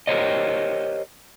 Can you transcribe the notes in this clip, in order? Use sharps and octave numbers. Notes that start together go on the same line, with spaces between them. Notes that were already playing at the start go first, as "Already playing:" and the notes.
G4 A#4 C5 C#5 D#5